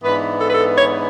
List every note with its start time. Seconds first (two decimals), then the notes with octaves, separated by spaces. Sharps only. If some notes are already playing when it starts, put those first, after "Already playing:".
0.02 G#2 E3 B3 D4 B4
0.39 A4
0.46 B4
0.53 A4
0.75 C#5